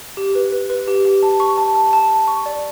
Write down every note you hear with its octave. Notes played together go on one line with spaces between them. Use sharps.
G4
B4
B4
B4
G4
G4
A5
C#6
A5
A5
A5
A5
C#6
D5